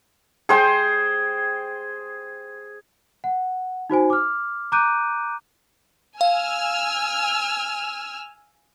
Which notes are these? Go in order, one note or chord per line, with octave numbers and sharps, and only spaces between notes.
G#4 C5 G5
F#5
D#4 F#4 C5 G#5
D6 F6
A#5 D6 F#6 G6 D7 D#7
F5 G#5 E6 F6